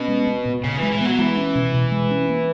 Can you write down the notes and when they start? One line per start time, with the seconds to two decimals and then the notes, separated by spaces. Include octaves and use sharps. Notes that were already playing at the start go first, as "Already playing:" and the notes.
Already playing: B2 C#4
0.08 G#3
0.27 B3
0.45 A#2
0.64 A#2 C#3
0.78 E3
0.83 G#3
0.92 E3
1.01 F#3 B3
1.19 E3 G#3
1.37 C#4
1.56 B2
1.74 B2
1.92 G#3
2.11 C#4
2.29 A#3